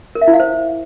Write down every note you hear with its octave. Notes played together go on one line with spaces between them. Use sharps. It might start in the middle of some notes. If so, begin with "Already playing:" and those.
A#4
E5
E4
F5
C5